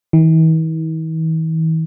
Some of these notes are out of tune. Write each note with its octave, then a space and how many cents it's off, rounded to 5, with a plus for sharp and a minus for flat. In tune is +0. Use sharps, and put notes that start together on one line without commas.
E3 -45